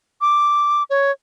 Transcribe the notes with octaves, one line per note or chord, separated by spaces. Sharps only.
D6
C#5